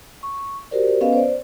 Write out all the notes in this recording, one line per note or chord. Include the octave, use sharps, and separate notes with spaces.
C#6
F#4 G4 A#4 C5 D5
B3 C#4 A4 B4 D#5 F5
C5 D5